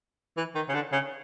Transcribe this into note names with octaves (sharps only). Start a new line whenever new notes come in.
E3
D#3
C#3
D3
C#3